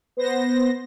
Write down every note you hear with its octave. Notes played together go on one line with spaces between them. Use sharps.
B3 C5 A#6